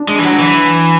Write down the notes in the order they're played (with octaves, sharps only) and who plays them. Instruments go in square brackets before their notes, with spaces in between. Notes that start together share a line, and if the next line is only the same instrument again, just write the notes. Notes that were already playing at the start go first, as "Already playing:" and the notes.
Already playing: [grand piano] D4
[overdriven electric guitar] G#3
E3
F#3
E3